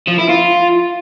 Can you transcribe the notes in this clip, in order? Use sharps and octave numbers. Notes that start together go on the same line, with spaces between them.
F3
E4
F4